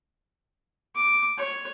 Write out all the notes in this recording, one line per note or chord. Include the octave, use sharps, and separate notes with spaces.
D6
C#5